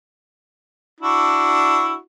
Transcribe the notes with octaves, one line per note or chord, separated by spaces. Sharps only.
D4 E4 F#4